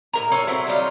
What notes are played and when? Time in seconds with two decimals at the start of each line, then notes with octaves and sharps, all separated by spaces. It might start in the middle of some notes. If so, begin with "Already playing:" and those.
0.13 A2 A#4 A#5
0.32 F4 A4 C#5 G#5
0.47 F#3 C4 E4
0.67 F#3 G3 D#4 F4